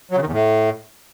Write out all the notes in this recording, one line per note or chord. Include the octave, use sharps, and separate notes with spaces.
F#3
C#3
D#3
E2
A2